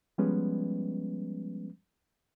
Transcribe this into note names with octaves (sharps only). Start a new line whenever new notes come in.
F3 G3 G#3 B3 C#4 B4